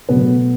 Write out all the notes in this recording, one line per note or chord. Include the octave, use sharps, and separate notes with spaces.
B2 F#3 A3 B3 B4